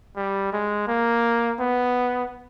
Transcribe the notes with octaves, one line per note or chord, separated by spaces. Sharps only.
G3
G#3
A#3
B3